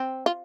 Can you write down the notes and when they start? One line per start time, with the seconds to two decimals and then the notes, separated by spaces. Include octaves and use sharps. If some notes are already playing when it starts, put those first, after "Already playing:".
Already playing: C4
0.26 F4